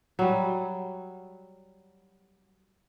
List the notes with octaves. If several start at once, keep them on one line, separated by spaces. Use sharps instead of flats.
F#3 G3